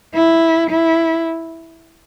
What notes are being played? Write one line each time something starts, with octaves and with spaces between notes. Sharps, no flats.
E4
E4